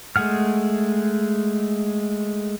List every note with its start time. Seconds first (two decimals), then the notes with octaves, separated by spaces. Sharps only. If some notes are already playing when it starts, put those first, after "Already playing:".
0.16 G#3 A3 G#4 F#5 F6